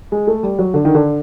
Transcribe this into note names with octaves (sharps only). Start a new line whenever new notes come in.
G#3
A3
G3
F#3
D3
D#3
D3